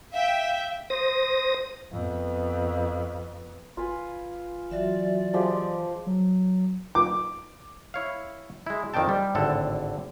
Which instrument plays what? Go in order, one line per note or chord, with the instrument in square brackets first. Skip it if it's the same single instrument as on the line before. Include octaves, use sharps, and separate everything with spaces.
[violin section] E5 G5 [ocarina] F5
[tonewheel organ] C5 D#6 A#6
[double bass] F2 B3
[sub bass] G1 [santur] F4 B4 G#5
[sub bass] E3 [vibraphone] F#3 F#4 E5 [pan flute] D5
[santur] F3 G#3 G4
[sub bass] F#3
[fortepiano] D6
[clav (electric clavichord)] E4 C#5 F5
G#3 E4
F2 D#3 C4 D4 G5 A5
G3
G#1 A2 D3 C4 A4